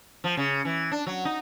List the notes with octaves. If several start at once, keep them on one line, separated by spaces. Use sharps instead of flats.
F3
C#3
E3
D4
F#3
D#4